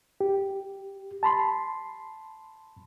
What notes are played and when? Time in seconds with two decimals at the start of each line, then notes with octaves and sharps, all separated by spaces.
0.21 G4
1.23 A5 B5 C6